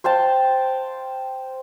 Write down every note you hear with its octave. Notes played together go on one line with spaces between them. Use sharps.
C5 F5 G5 A5